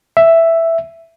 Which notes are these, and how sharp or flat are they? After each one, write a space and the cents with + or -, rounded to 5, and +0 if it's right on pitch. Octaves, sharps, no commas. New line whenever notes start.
E5 +5